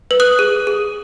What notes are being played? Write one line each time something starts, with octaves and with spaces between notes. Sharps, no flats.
B4
D#6 F#6
G#4
G#4